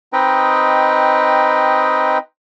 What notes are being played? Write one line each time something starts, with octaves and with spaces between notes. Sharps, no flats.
C4 D#4 B4 D#5 G5